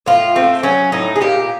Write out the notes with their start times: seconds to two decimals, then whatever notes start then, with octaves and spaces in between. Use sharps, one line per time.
0.06 A2 F4
0.35 A3 C4
0.63 F#3 C#4
0.92 A2 D#4
1.16 G#4
1.21 A#2 G4